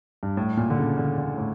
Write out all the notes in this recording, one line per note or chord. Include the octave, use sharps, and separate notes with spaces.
G2
A2
A#2
D3
C#3
D3
D3
A2